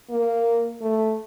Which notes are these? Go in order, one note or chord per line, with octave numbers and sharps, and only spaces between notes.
A#3
A3